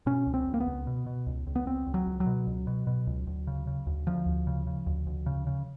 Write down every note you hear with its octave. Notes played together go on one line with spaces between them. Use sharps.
B2 C#4
C#2
C4
C#2
A#3
B3
C#2
B2
B2
C#2
C#2
B3
C#2 C4
C#2
F#3
C#2
F#3
B2
C#2
B2
B2
C#2
D2
C#3
C#3
D2
D2 F3
D2
C#3
C#3
D2
D2
C#3
C#3